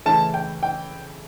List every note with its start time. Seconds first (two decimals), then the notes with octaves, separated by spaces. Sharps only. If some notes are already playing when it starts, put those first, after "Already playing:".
0.06 C#3 E3 A3 C#4 E4 A5
0.34 G5
0.63 G5